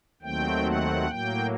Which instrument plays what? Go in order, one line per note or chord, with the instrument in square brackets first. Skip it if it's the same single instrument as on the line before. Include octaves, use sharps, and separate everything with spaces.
[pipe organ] D#2 D#3 F#3 A3 C4 G5
F#5
A2 F#3 A#3 G5